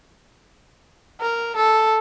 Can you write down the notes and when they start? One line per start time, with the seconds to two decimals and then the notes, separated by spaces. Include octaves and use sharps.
1.21 A#4
1.56 A4